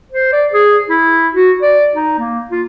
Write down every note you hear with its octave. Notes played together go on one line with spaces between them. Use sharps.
C5
D5
G#4
E4
F#4
D5
D#4
A#3
F4